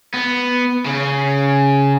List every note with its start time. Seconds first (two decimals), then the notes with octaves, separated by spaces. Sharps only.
0.14 B3
0.86 C#3